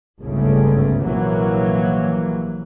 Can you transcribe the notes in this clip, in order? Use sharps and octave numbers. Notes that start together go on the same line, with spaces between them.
G1 C#2 G#2 C#3 A3
A#1 C3 E3 F#3 A#3